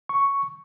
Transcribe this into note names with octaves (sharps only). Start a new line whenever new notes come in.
C#6